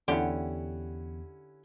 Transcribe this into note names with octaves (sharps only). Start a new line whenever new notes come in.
E2 D3 C#4 E4 G4 F#5